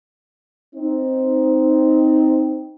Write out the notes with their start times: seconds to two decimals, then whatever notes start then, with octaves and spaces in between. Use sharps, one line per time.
0.76 C4 D#4